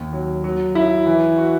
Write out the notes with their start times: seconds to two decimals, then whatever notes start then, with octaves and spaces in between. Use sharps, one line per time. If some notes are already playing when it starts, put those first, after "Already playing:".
Already playing: D#2
0.13 F#3
0.44 F#3
0.75 E4
1.06 E3
1.38 F#4